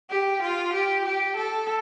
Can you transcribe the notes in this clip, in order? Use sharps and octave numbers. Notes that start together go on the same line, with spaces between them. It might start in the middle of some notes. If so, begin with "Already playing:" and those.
G4
F4
G4
G4
A4